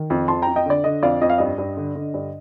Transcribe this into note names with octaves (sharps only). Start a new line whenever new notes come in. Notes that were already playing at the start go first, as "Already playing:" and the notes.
Already playing: D#3
F2
F2 A5 C6
F2 G5 A#5
D#5 G5
D3 D5
D3 D#5
F2 D5 F5
F2 D#5
F5
G2 D#5
G2
D3
D3
G2